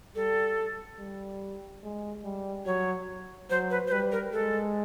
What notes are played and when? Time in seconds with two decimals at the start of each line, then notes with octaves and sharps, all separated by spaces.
0.15 G3 A4
0.99 G3
1.83 G#3
2.24 G3
2.66 F#3 C#5
3.50 F#3 C5
3.70 B4
3.87 C5
3.92 G3 B4
4.12 A#4
4.33 G#3 A4